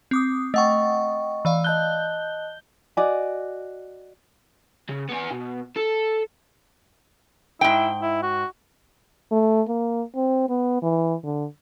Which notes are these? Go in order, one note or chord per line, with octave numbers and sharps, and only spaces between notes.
C4 D6 D#6
A3 D#5 F#5 G5 C#6
E3 D5 F5
D#5 A5 F#6 G6 G7
F#4 D5 D#5 G#5
C#3
B3 G#5
B2
A4
G#2 E4 G5
E4
F#4
A3
A#3
C4
B3
E3
D3